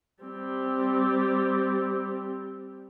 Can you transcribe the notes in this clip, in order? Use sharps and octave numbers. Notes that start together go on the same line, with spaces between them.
G3 C4